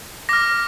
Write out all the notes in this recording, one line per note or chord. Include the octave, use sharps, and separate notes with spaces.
D6 F6 A#6